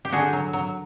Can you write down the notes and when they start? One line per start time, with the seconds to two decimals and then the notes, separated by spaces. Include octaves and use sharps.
0.05 G4
0.12 D3 F#4 G#4
0.33 F#3
0.53 F#3